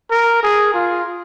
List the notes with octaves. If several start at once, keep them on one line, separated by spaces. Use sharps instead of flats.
A#4
G#4
F4